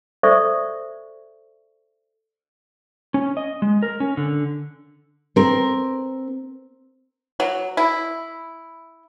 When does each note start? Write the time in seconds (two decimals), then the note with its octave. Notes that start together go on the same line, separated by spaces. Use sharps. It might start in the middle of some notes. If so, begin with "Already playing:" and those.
0.23 A4 C5 D5 E5 C#6
3.14 C#4
3.37 D#5
3.62 G#3
3.83 A#4
4.00 C#4
4.17 D3
5.36 C4 A#4
7.40 F#3
7.77 E4